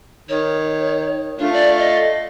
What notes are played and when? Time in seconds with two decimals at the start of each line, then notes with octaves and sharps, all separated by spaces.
0.29 D#3 C#5
1.39 A3 D4 F4
1.53 D5
1.78 D#5